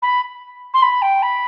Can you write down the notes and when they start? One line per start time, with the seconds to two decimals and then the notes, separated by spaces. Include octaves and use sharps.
0.02 B5
0.74 C6
0.82 B5
1.02 G5
1.22 B5